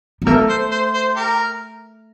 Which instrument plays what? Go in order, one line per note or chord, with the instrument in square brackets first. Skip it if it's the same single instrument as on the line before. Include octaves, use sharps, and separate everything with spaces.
[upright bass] G3
[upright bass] A3 [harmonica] A#4
[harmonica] C5
C5
C5
G4 A#4